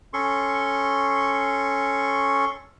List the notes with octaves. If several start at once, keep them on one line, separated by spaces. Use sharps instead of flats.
C#4 A4 C6 C#6